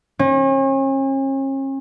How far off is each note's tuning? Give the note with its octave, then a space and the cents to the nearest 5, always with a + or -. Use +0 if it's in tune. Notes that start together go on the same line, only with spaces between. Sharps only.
C#4 -40